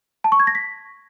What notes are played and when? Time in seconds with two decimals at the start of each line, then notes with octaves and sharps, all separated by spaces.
0.24 A5
0.32 C#6
0.40 G#6
0.47 A#6
0.55 B6